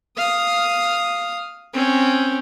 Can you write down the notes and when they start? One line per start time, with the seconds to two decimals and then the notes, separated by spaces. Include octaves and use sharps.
0.17 F5 D#6
1.73 C4 C#4